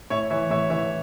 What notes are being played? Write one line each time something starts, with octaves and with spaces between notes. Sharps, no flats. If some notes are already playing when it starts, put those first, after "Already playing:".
A2 C#5 E5
E3 C#5 E5
A2 C#5 E5
E3 C#5 E5